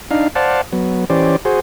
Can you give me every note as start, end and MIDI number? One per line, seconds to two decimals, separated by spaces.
0.11 0.28 62
0.11 0.28 63
0.11 0.28 77
0.35 0.61 72
0.35 0.61 74
0.35 0.61 77
0.35 0.61 78
0.35 0.61 81
0.72 1.05 54
0.72 1.05 59
1.10 1.36 52
1.10 1.36 61
1.10 1.36 67
1.10 1.36 72
1.10 1.36 74
1.45 1.60 66
1.45 1.60 68
1.45 1.60 72